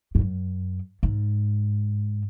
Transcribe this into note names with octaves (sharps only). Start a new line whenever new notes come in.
G#2
F#2
G#2